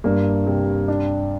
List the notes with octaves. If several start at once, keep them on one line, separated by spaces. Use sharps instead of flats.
G2 A#3
C3
D4